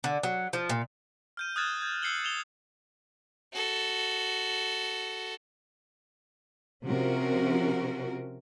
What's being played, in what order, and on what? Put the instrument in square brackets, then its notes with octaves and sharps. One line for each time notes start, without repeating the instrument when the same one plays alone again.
[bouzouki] D3
F#3
F3
A#2
[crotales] F6 G6 D#7
D#6 F6 F#6 G#6 A6 E7
G6 G#6
E6 G6 C7 C#7 F#7 G7
E7 F7 G7
[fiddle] F#4 A4
[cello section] C3 F3 C#4 F#4 A#4